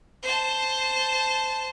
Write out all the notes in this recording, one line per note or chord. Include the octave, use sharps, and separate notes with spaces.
C5 A5